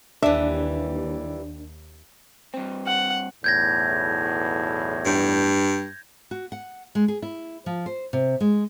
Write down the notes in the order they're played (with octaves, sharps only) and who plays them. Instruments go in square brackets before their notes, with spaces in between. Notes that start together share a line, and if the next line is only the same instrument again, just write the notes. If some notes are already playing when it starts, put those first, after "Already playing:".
[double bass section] D#2 [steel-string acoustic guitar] E3 G3 [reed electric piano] D4 [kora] E5
[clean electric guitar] G2 C4
[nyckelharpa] F#5
[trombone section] B1 E2 A2 [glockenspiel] G6 G#6 A#6
[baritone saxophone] G2
[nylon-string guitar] F#4
F#5
G#3
G#4
E4
F3
C5
C3
G#3